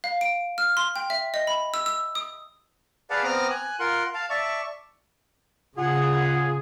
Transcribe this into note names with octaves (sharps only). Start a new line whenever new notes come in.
F5
D7
F6
C6
G5
E5
D#5
B5
E6
E6
D#6
G#4 B4 D5 F5 F#5 A5
B3 C4 A#5 D6 D#6 F6
G#5 F#6
F4 A#4 F#5 C6
F5 A5
D5 E5 A5 C#6
C#3 F4 G#4 F#5